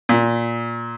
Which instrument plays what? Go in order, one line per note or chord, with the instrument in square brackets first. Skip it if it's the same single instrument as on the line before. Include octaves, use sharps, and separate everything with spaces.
[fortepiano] A#2